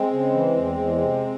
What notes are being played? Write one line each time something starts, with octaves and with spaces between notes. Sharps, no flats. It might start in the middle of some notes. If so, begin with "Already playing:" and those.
Already playing: G#3 C4
C#3
E3
E2
E2
C3